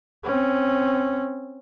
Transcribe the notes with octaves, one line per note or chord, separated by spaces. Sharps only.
C4 C#4